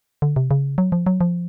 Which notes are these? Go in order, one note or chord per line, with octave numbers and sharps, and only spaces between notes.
D3
C3
C#3
F#3
F3
F#3
F3